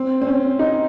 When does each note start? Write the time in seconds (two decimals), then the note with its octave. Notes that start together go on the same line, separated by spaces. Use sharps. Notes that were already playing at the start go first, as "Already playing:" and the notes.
Already playing: C4
0.22 C4
0.27 C#4
0.59 D#4